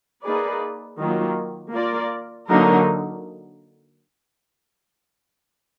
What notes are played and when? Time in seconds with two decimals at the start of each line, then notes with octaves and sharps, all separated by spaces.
0.23 A#3 D#4 G#4 B4 D5
0.98 D#3 F#3 A#3 F4
1.72 A#3 F4 A#4 D5
2.47 D3 F#3 A#3 D#4 A#4